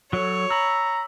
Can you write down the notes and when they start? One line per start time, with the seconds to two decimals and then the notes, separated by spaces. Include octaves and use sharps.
0.13 F#3 A4 C#5
0.51 A#5 B5 E6